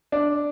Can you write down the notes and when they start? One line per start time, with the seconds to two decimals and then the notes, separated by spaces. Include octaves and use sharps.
0.12 D4